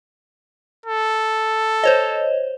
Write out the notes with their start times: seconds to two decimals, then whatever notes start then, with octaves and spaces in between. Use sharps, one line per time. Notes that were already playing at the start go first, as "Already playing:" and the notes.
0.86 A4
1.84 C5 C#5 D#5